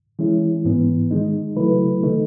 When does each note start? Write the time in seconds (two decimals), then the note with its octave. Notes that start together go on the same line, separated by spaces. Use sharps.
0.19 E3 G#3 C#4 E4
0.65 G#2 E3 B3
1.11 D#3 G#3 D#4
1.56 C#3 F#3 A3 E4 B4
2.03 D#3 A3 D#4